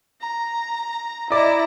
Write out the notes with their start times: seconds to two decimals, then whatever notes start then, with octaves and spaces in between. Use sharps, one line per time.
0.21 A#5
1.31 E4 D5 D#5 A#5